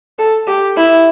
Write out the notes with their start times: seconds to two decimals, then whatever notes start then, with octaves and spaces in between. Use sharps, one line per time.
0.19 A4
0.47 G4
0.77 E4